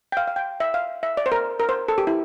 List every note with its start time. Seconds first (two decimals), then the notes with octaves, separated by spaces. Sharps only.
0.12 G5
0.17 F5
0.27 F5
0.36 G5
0.60 E5
0.74 F5
1.03 E5
1.17 D5
1.26 C5
1.32 A#4
1.60 A#4
1.69 C5
1.88 A4
1.98 G4
2.07 E4